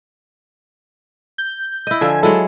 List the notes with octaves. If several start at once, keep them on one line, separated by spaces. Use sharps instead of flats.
G6
E4 D#5
D3 F3 E5 G#5
F#3 G#3 E4 A4